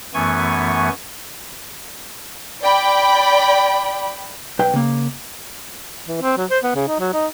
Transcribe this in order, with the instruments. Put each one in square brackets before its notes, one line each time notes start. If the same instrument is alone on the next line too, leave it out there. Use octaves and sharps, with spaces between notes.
[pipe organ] F#2 E3 A3 B3 G#5 C#6
[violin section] D5 G5 B5
[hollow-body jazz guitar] B1 B4 G5
C#3 A#3
[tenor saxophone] E3
C4
F#3
C5
B3
C#3
D#4
F#3
D#4